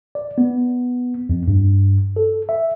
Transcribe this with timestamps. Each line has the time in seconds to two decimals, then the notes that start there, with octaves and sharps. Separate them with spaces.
0.15 D5
0.38 B3
1.29 F2
1.48 G2
2.16 A4
2.49 E5